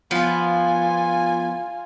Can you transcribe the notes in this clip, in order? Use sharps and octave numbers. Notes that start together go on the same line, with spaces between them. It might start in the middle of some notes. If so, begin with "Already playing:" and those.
F3 B3 F4 G#5